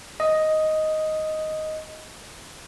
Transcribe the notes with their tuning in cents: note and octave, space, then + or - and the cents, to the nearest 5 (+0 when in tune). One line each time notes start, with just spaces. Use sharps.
D#5 +5